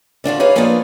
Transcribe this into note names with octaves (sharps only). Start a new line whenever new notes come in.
D3 D4 F4 F#4
D#4 G#4 B4 C#5 F5
F3 A#3 B3 D4 D#4 F4